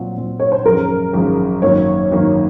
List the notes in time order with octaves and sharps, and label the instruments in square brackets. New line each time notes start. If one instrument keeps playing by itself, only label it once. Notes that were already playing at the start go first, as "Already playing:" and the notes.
Already playing: [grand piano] A#2 F#3 C4
A#2 F#3 C4
[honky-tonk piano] C#5
C5
[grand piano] G#1 F#2 F3 G#3 C#4 [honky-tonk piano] A#4
[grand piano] G#1 F#2 F3 G#3 C#4
[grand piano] G#1 F#2 D#3 A#3 [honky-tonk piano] C#5
[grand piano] G#1 F#2 D#3 A#3